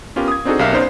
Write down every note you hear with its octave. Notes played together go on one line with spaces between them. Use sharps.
B3 C#4 F4 G4 A#4
D#6 G#6
C4 D4 D#4 F#4 G#4 A4
B1 G4 A#4 E5 F5 C7
B3 C#4 D#4 C5 D5 F5